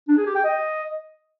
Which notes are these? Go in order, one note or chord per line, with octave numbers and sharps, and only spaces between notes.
D4
G#4
G4
G5
D#5